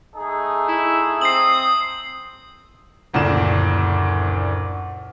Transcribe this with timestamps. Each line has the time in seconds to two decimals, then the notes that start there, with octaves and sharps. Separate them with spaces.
0.15 A3 D#4 G#4
0.68 E4
1.21 C4 D#6 C7 F#7
3.13 F#1 D2 A#2 D4 E7